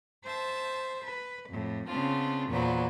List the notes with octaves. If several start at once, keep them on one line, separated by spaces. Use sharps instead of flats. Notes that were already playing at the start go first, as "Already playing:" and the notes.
C5 E5 A5
B4
F2 A2
C#3 B3 C4 D4 F4
E2 A#2 E3 F#3 B4 C5